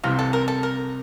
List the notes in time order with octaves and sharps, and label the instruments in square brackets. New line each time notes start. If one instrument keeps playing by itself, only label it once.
[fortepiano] C2 C3 E3 [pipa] F4
[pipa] A4
A#4
A4
A#4